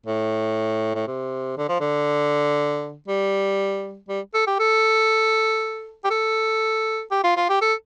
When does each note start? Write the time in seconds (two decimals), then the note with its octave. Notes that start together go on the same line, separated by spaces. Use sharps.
0.06 A2
0.95 A2
1.07 C3
1.57 D3
1.69 F3
1.80 D3
3.08 G3
4.09 G3
4.34 A4
4.47 G4
4.59 A4
6.04 G4
6.10 A4
7.11 G4
7.24 F4
7.36 F4
7.49 G4
7.61 A4